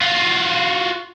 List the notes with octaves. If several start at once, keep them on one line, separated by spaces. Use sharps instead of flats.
F4 F#4